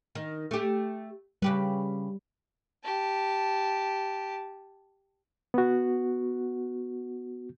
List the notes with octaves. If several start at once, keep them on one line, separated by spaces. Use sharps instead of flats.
D#3
A3 G4
C#3 G3 G4 B4
G4 A5
B3 F#4